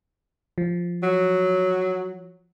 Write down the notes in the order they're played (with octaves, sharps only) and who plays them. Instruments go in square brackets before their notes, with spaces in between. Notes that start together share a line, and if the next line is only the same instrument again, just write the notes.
[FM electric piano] F3
[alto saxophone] F#3